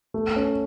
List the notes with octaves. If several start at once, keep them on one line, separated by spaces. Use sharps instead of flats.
A3
C#4